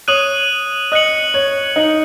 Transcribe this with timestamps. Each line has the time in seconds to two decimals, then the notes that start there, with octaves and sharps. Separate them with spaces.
0.08 C#5 D#6 F#6 D#7 F#7
0.92 D#5 D#6 F#6 C#7 F#7
1.34 C#5
1.76 D#4 F#6 C#7 F#7